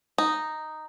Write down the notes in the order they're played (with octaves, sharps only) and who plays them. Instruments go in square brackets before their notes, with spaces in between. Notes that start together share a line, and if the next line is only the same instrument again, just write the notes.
[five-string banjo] D#4